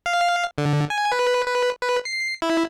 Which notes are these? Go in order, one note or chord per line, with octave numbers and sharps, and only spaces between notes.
F5
D3
G#5
B4
B4
B4
C7
E4